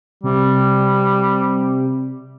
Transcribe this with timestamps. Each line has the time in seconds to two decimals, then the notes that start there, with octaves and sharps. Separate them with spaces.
0.23 C3 G3